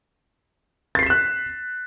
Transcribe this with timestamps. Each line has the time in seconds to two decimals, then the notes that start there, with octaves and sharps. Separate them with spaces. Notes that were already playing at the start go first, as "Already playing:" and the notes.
0.95 A6
0.99 C7
1.03 B6
1.06 E7
1.10 F#6